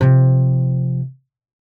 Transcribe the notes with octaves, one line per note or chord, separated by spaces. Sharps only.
C3 F3